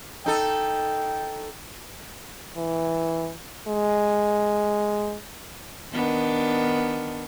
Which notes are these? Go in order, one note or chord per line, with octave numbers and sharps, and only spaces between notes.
D#4 A4 G5
E3
G#3
D#3 B3 D4